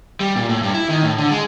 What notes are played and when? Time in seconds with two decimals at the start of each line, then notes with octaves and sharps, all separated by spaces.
0.20 G3
0.36 A#2
0.49 A2
0.63 G2
0.74 E4
0.90 D#3
1.03 A2
1.18 D3
1.31 G#3